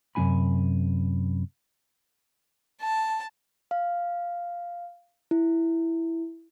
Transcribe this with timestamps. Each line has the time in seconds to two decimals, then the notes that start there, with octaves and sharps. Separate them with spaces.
0.15 F#2 C3 G#3 D#4 G#5 B5
2.82 A5
3.71 F5
5.31 E4